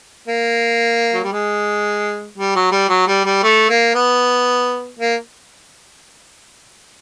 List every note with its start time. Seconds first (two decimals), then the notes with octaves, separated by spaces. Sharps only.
0.28 A#3
1.14 F#3
1.24 G3
1.32 G#3
2.38 G3
2.55 F#3
2.72 G3
2.89 F#3
3.07 G3
3.25 G3
3.43 A3
3.69 A#3
3.95 B3
4.99 A#3